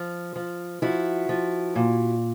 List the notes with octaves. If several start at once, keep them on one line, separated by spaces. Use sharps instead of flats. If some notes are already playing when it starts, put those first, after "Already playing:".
Already playing: F3
F3
F3 E4 F#4
F3
A#2